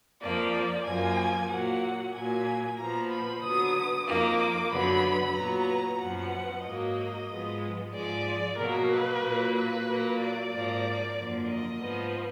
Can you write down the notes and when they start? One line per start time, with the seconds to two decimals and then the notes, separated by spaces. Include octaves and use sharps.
0.21 F2 F3 A#3 D5
0.86 F#2 F3 A#3 G#5
1.50 A#2 F#3 A#3 F#5
2.14 A#2 F#3 A#3 G#5
2.78 A#2 F3 B3 A#5
3.11 B5
3.43 D3 F#3 B3 D#6
4.08 F2 D#3 A#3 D6
4.72 F#2 D3 F#3 B3 B5
5.36 A#2 F#3 B3 A#5
6.00 F#2 F3 B3 F#5
6.65 G#2 F#3 A#3 D#5
7.29 G#2 F3 G#3 B3
7.94 G#2 F3 G#3 D5
8.58 B2 F#3 A#3 A#4
8.90 B4
9.23 A#2 F#3 A#3
9.55 B4
9.87 A#2 F#3 A#3
10.20 D5
10.52 G#2 F3 A#3
11.16 F#2 D3 F3 A#3
11.48 D#5
11.80 G#2 F3 B3